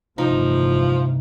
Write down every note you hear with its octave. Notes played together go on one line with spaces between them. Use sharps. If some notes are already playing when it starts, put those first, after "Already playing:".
G1 A2 C3 E3 F3 D#4